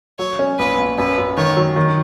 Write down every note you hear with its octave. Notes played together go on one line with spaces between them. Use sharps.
F#3 C#5
C#4
A#1 B4
A#1
F#2 B4
F#2
D#3 C#5
F#3
D#3